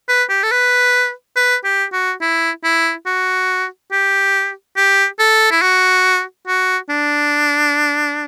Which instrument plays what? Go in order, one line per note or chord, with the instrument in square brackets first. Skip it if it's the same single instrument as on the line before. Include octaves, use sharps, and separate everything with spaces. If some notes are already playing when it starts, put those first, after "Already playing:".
[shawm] B4
G4
A4
B4
B4
G4
F#4
E4
E4
F#4
G4
G4
A4
E4
F#4
F#4
D4